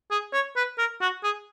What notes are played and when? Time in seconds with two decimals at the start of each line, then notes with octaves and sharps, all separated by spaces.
0.11 G#4
0.33 C#5
0.56 B4
0.78 A#4
1.01 F#4
1.23 G#4